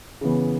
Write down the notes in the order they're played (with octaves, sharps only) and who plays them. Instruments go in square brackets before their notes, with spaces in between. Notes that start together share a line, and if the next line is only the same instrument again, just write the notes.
[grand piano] C#3 E3 B3